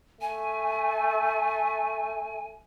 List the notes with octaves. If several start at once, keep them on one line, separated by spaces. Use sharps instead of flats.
A3 G#5